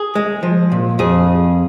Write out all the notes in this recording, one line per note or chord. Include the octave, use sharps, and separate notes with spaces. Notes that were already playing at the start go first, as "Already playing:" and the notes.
Already playing: G#4
G#3
F3
A#2
F2 G#4